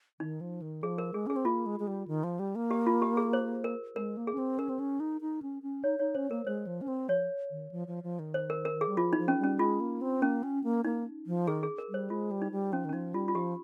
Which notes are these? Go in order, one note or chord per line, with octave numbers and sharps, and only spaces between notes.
D#3 D#4
F3
D#3
F3 G#4
A#4
G#3 G#4
C#4 G#4
C4
A#3 F4
G#3
G#3
G3
D#3
F3
G3
A#3
G4
F4
G4
G#4
C5
A#4
G#3 A#4
A#3
G#4
C#4
C4
C#4 A#4
C4
C#4
D#4
D#4
C#4
C#4
D#4 C#5
D#4 C#5
C#4 C5
A#3 A#4
G#3 C5
F3
C#4
C4
F3 C#5
D#3
F3
F3
F3
D#3
C5
A#4
A#4
G#4
G3
F3 F4
D#4
F3
C#4
G3
C#4
G#3 F4
A#3
C4
A#3 C#4
C#4
A#3
A#3 D#4
F3
D#3 G#4
G#4
A#4
G3 C5
G#3 F4
G3
D#4
G3
F3 C#4
D#3
C#4
F3 D#4
G3 F4
F4
F3 G4